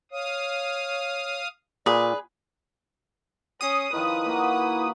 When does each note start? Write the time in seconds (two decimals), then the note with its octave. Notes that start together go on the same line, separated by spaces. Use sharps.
0.12 C#5 F5 D#6
1.86 A#2 G#4 B4 D5
3.61 C#4 D#6 C7
3.93 D#3 F3 E4 B4 F5
4.26 A#3 F#4